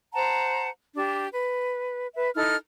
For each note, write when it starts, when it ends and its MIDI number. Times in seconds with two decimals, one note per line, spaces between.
0.13 0.69 72
0.13 0.69 78
0.13 0.69 81
0.13 0.69 82
0.94 1.26 62
0.94 1.26 67
1.32 2.08 71
2.15 2.28 71
2.15 2.28 76
2.35 2.55 63
2.35 2.55 64
2.35 2.55 69
2.35 2.55 89